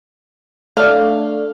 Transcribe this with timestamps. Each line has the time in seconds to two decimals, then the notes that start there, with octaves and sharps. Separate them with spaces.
0.77 A3 D4 F5